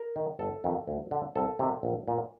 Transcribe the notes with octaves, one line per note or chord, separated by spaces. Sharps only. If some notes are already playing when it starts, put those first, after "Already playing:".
Already playing: A#4
D#3
G1 A4
F2 D#3
D2
D3
C2 A4
C3 D#3
A#1
A#2